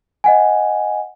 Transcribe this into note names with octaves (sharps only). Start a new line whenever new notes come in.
D#5 F#5 G#5